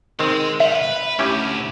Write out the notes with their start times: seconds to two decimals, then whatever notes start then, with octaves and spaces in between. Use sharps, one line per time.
0.19 D#3 G#3 C4
0.60 G3 E5
0.75 B4
1.19 D2 C#4 E4 G4